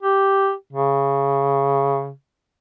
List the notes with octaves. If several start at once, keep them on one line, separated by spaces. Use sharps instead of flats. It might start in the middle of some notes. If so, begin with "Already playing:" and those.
G4
C#3